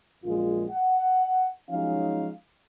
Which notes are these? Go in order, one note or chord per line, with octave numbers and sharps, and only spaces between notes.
A#1 F#2 G#3 F4
F#5
F3 F#3 G#3 C#4 D#4 F5